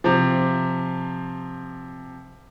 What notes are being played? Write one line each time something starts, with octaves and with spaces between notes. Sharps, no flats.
C3 F3